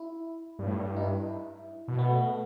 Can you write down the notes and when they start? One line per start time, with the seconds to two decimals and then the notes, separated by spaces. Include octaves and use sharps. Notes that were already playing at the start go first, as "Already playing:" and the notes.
Already playing: E4
0.59 G2
0.67 A2
0.74 G2
0.96 D#4
1.02 E4
1.88 B2
1.99 B3
2.10 A3
2.16 B3
2.21 A3